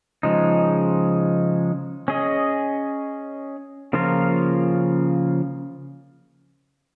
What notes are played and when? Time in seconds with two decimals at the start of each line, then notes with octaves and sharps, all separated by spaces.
0.23 C#3 F3 G#3 D#4
2.08 C#4 G#4 D#5
3.93 C#3 F3 A#3 F4 A#4